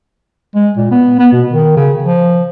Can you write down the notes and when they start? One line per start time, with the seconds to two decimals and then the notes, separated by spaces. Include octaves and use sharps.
0.55 G#3
0.77 A#2
0.91 B3
1.19 B3
1.32 B2
1.52 D#3
1.77 C#3
2.03 F3